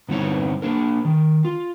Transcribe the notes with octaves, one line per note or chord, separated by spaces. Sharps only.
G2 D3 B3 C4 D#4 C#5
A#3 D4 A#4
D#3
F4